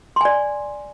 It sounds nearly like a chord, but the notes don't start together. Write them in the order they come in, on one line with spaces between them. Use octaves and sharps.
C6 G#5 D5